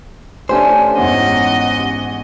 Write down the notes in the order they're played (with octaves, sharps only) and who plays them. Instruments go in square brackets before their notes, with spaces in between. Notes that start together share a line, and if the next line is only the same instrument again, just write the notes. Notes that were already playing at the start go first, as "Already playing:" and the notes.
[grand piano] A3 D4 [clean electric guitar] C#4 G4 C5 [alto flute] G#5
[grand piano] E2 G#2 [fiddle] D#5 [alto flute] F#5